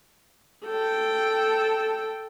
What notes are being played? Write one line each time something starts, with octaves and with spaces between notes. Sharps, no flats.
A4 G5